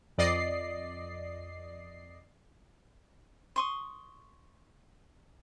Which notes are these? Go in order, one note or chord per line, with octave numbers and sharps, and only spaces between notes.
F2 D5 D#5 C7
C6 C#6 D#6